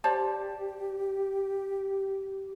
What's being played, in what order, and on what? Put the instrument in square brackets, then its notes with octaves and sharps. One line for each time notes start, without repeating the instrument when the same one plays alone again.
[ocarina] G4 [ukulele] C5 D5 A5